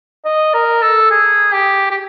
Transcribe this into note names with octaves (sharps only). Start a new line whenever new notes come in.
D#5
A#4
A4
G#4
G4
G4